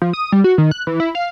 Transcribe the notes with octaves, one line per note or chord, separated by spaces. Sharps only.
F3
D#6
G3
F#4
D#3
F#6
E3
E4
F5